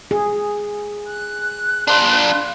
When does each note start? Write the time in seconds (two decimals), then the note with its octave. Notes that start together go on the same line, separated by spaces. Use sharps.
0.11 G#4
1.06 F#6
1.88 D4 F4